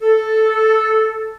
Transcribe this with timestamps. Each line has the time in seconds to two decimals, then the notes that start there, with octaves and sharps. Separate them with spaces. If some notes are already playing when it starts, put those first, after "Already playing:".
0.01 A4